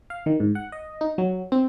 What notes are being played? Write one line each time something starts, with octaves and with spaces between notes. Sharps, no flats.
F5
D#3
G#2
F#5
D#5
D#4
F#3
C4